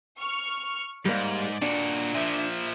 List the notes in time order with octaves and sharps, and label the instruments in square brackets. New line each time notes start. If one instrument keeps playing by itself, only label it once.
[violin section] C#6 F6
[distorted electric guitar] G#2 [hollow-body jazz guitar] G3 A#3 [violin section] D5
[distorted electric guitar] A#2 F#4 [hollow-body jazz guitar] D4
[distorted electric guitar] A#2 F3 [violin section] E5